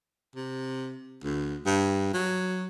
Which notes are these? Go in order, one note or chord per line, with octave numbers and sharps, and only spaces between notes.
C3
D2
G2
F#3